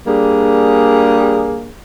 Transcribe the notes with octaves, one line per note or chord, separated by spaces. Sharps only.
G3 A#3 D4 G#4